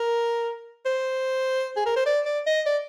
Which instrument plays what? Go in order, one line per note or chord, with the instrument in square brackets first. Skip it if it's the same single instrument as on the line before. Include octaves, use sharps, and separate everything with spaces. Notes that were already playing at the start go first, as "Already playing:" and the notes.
Already playing: [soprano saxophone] A#4
C5
G#4
A#4
C5
D5
D5
D#5
D5